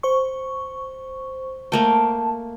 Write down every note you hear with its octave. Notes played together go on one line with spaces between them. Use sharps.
C5 C#6
A3 A#3 G5 A5